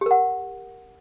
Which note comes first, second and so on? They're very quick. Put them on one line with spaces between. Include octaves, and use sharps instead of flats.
G4 A#4 F#5